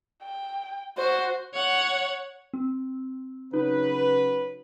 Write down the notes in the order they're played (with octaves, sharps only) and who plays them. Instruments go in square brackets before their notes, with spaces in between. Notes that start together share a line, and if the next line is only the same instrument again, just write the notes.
[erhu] G5
[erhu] F#4 [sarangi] C5
[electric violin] C#5 F#5
[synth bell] C4
[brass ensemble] C#3 F#3 B4 [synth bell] D#4